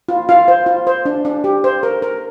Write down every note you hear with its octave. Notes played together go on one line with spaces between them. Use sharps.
F4
F4 F5
C5
F4
C5
D4
D4
G4
C5
A#4
A#4